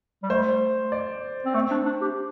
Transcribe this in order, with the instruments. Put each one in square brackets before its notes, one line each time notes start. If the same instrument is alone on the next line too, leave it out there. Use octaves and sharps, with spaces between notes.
[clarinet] G3
[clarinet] A3 [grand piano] C5
[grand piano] D5
[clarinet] C4
[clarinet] A3 [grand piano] C5
[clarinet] D4
D4
G4